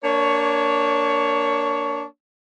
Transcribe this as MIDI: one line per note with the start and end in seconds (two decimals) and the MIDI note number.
0.03 2.03 58
0.03 2.03 62
0.03 2.03 73